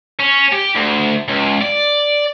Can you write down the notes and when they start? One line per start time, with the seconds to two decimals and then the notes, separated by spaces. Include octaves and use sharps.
0.19 C#4
0.52 G4
0.75 D2
1.28 C#2
1.61 D5